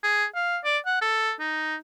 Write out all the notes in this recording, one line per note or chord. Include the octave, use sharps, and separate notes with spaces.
G#4
F5
D5
F#5
A4
D#4